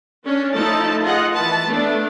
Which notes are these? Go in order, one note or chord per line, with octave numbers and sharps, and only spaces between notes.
C#4 D4
F3 A3 D#4 E4 A4 A5
F4 G#4 D#5 F#5
E3 B4 A5
A3 B3 D4